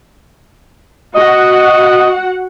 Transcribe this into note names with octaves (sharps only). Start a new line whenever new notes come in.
F#4 D#5 F#5